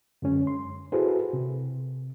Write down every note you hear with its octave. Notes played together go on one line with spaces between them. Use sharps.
F#2 D3 G#3 C#4
C6
E4 F#4 G#4 A4 B4 C5
C3